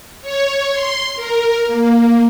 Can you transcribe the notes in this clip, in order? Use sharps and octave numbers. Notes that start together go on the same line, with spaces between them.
C#5
C6
A#4
A#3